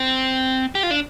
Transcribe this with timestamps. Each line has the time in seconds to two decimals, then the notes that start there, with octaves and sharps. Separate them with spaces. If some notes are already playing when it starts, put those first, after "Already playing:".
Already playing: C4
0.75 G4
0.83 F4
0.91 D4